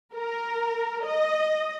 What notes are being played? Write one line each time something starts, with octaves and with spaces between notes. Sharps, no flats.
A#4
D#5